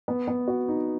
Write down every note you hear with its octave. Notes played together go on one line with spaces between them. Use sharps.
B3
B3
F#4
D#4